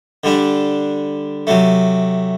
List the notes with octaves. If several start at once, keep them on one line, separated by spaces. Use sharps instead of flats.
D3 G3 D4
C3 F#3 A3